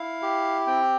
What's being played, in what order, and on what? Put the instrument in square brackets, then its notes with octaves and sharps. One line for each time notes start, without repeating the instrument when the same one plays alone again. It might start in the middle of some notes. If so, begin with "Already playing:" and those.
Already playing: [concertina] E4 F5
G4
C4 G5